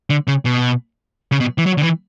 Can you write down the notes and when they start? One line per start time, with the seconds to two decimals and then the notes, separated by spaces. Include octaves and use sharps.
0.10 D3
0.28 C#3
0.45 B2
1.32 C#3
1.40 B2
1.58 E3
1.66 F#3
1.78 D3
1.83 E3